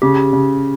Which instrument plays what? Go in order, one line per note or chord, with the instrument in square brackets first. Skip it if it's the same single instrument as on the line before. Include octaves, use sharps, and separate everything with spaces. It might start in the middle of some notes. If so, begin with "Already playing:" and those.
[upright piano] C#3 [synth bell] G4
[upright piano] C#3